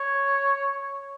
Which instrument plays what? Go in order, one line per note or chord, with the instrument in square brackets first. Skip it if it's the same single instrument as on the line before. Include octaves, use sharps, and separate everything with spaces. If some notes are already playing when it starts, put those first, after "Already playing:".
Already playing: [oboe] C#5